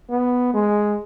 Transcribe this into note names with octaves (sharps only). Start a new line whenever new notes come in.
B3
G#3